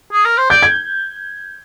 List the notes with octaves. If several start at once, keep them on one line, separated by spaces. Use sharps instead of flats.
G#4
A#4
C5
D5 G6
G#6